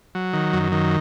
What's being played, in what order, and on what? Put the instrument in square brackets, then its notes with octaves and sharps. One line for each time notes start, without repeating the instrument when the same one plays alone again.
[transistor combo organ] F#3
D#3
F#2
D#3